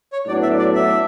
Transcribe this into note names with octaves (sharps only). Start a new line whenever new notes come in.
C#5
A2 F#3 B3 D4 D5
E5
D5
E5